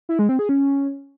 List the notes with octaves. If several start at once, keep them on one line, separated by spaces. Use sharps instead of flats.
E4
G#3
C4
G#4
C#4